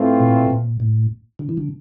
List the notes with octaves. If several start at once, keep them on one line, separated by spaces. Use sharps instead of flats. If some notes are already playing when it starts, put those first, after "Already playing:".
Already playing: A2 E3 A3 C4 F4
A#2
A#2
A2
D3
E3
D3